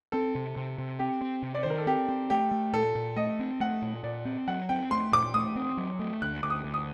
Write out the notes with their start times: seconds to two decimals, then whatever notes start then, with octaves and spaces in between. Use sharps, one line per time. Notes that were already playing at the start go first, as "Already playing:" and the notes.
0.12 C4 A4
0.35 C3
0.56 C3
0.78 C3
0.99 C4 G4
1.21 C4
1.42 C3
1.55 D5
1.63 D#3 C5
1.70 A#4
1.78 A4
1.87 C4 G4
2.09 C4
2.30 A3 G4
2.51 A3
2.73 A#2 A4
2.95 A#2
3.16 A3 D#5
3.39 C4
3.60 A3 F#5
3.82 A#2
4.04 A#2 D5
4.25 C4
4.48 F#3 F#5
4.69 C4 G5
4.91 A3 C6
5.12 A#2 D6
5.34 A3 D#6
5.56 C4
5.77 F#3
5.99 A3
6.22 D2 F#6
6.43 D2 D6
6.50 D#6
6.64 D2
6.74 D#6